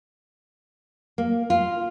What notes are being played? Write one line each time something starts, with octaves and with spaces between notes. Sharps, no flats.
A#3
F4